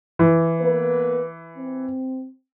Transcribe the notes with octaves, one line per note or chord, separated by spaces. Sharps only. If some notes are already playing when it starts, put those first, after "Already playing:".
E3
A#3 B3 B4
C4